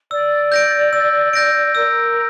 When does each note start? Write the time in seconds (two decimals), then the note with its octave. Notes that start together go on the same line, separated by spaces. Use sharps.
0.11 D5 E6
0.52 G6 A#6 D7
0.93 E6
1.33 G6 A#6 D7
1.75 A#4 E6